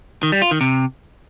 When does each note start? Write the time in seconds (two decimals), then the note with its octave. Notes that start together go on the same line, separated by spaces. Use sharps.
0.23 D#3
0.32 G3
0.42 F4
0.51 D#3
0.61 C3